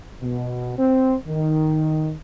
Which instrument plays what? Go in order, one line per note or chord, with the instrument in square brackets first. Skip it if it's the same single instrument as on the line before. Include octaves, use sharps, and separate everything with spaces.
[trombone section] B2
C4
D#3